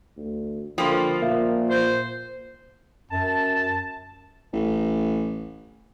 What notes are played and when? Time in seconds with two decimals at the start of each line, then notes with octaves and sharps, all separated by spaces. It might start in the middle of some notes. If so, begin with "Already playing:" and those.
0.17 D2
0.78 D3 F3 A#3 G5 B5 C6
1.22 A#2 A#4 E5 F5
1.70 C5 G6
3.11 F#2 A5
4.53 A1